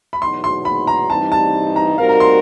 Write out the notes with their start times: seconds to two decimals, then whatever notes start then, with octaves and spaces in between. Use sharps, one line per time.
0.13 B5
0.21 E2 B2 F#3 B3 D#4 C6
0.44 C6
0.65 B5
0.87 A#5
1.10 G2 E3 G3 C4 D#4 A5
1.32 A5
1.76 A#5
1.98 G3 C4 D#4 F#4 A#4 F5
2.09 A#5
2.20 C6